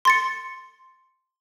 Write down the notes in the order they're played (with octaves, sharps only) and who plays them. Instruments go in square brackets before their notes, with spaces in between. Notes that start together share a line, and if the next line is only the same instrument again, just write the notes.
[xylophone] C6 A6 C#7